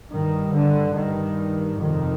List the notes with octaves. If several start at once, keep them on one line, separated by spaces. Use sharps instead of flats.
G2 D#3
D3
G2 D#3
F2 C3 D#3